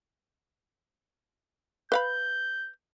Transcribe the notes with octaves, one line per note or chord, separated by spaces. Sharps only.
B4 F5 B5 G6